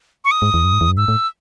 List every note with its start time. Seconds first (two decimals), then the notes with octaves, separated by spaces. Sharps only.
0.25 C#6
0.31 D#6
0.42 G#2
0.54 E2
0.64 F#2
0.73 G#2
0.81 E2
0.89 F#2
0.97 G#2 E6
1.08 A2